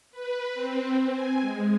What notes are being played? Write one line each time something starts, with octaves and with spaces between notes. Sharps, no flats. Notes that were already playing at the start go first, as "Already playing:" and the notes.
B4
C4
G#5
G#3